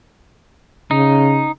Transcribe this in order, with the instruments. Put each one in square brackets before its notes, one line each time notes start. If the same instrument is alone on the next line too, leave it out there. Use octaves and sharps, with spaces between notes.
[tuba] C#3 [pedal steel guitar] D#4